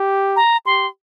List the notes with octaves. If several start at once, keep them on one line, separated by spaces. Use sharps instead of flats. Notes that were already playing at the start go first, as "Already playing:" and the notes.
Already playing: G4
A#5
G4 C6